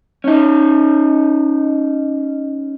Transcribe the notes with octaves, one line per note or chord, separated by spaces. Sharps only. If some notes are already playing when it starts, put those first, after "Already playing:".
C#4 D#4